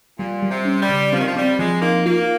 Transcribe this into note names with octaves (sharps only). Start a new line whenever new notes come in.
A#2 G3
G3
C3
C#4
G3
C#3
F3 C4
D#3
F3
G3 C4
F3 G#3
A#3 D#4
A#3 F4